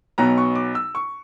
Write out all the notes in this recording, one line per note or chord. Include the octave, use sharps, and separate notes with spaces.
B1 B2 F#3 B3 A#5
C#6
D6
E6
C#6